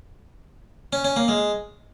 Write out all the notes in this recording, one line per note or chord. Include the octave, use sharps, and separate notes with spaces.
C#4
C#4
A#3
G#3